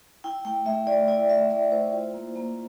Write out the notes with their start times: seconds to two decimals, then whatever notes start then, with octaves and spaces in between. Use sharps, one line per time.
0.24 E4 G5
0.45 A3 G5
0.66 A3 E5
0.87 E4 D5
1.08 E4 D5
1.30 A3 E5
1.50 A3 D5
1.72 E4 C5
1.93 F4
2.14 A#3
2.36 A#3